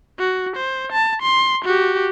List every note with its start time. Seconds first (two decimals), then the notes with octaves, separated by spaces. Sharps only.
0.19 F#4
0.56 C5
0.92 A5
1.22 C6
1.65 F#4 G4